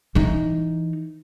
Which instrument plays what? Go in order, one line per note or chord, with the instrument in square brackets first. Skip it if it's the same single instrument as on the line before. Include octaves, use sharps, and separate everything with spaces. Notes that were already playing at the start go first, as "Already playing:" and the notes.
[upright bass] E3 D#4